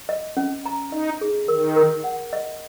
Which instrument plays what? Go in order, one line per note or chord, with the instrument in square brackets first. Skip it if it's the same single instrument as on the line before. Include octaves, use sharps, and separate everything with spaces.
[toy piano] D#5
C#4
A#5
[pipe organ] D#4 [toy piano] D#5
[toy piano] G#4
[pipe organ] D#3 [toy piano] A#4
[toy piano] A#4
F#5
D#5